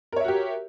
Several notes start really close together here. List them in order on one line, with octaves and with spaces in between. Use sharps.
A#4 C#5 E5 F#4 G4